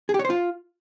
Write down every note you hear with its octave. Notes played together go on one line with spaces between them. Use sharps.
G#4
G4
C#5
C5
F4